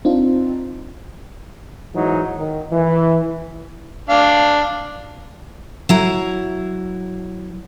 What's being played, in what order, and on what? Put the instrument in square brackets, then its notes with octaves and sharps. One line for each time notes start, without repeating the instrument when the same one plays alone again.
[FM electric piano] C4 D4 D#4 F4
[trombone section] G#2 E3 F#3 D#4
D#3
E3
[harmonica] D4 F5
[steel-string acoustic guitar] F#3 E4 A#5